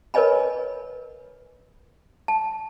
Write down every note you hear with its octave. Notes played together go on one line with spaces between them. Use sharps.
A#4 B4 C#5 D#5 G#5 B5
A5